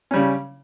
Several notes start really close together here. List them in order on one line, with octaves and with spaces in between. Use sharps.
C#4 G3 C#3